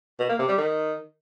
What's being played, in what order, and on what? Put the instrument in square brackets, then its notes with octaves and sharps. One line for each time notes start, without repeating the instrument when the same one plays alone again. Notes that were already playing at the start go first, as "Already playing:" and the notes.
[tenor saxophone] B2
A#3
C3
G3
D#3